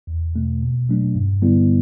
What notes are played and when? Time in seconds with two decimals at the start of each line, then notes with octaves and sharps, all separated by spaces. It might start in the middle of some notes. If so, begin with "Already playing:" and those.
0.07 E2
0.35 B2 A3
0.62 B2
0.89 F#3 A3 D4
1.15 G2
1.42 D3 G3 B3 E4